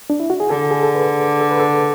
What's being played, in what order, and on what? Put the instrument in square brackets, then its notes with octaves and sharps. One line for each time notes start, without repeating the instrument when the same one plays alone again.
[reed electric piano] D4
E4
F#4
G#4
[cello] D3 [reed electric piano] A4
[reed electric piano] G#4
A4
B4
A4
B4
A4